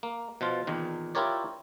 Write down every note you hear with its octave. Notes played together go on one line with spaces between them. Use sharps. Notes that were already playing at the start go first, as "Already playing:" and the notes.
A#3
B2 F3 F4
E2 A#2 D#3
E4 F4 G4 A#4 C#5 D5